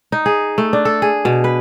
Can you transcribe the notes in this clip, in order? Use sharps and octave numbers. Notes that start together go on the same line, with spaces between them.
D#4
G#4
A3
D4
A4
G#4
B2
B4